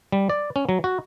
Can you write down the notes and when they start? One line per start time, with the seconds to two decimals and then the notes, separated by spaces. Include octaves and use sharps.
0.12 G3
0.30 D5
0.56 C#4
0.69 F#3
0.84 F#4